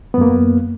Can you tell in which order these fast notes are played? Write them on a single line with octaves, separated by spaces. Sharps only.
B3 F#2 A#3